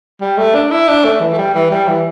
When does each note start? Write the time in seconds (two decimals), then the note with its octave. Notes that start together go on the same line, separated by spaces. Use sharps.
0.21 G3
0.38 A3
0.54 D4
0.71 E4
0.88 D4
1.04 A3
1.21 E3
1.33 A3
1.38 G3
1.54 E3
1.71 G3
1.88 E3